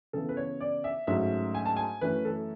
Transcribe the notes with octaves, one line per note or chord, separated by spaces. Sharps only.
C#3 E3 B3 A4
B4
C#5
D5
E5
G#2 F#3 A3 C#4 E5
G#5
A5
G#5
F#2 E3 A3 C#4 B4
A4